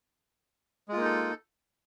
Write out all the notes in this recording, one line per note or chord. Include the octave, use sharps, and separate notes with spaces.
G#3 A#3 D#4 F4 A4